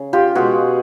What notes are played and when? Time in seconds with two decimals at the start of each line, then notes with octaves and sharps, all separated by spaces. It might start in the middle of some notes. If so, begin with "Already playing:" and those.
Already playing: C#3
0.13 F4 G4
0.35 B2 G#3 F#4 G#4